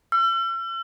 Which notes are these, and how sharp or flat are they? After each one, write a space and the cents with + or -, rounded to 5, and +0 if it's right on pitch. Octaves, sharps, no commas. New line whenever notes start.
E6 +45